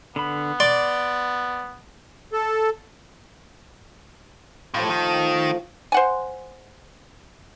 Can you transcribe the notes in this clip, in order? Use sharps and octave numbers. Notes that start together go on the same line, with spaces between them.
D3 B3 B5
D5 C6 D6
A4
A2 F3 A3 F4
D#3
C5 F#5 G#5